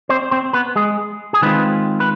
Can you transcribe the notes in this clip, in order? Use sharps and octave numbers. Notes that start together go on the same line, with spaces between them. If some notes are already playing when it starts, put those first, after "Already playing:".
C4 C5
C4 C5
B3 B4
G#3 G#4
G#4
D#3 G#3 B3 C4 F4 B4
B4